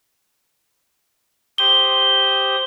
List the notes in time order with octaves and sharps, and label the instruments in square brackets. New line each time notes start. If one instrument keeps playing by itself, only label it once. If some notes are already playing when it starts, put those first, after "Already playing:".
[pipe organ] G4 C5 D#6 [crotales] G7